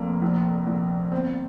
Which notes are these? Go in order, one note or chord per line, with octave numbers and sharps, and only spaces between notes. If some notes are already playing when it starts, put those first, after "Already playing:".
Already playing: F1 F2 A#3
A#1
A#1
G1 C4